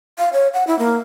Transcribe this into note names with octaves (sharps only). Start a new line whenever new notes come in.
F5
C#5
F#5
E4
A#3